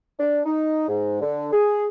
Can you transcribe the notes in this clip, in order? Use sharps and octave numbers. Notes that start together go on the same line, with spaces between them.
D4
D#4
G#2
D3
G#4